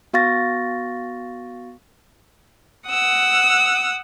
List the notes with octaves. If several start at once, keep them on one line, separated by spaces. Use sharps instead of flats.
B3 F#4 F5 C#6 A6 A#6
F#5 D#6 E6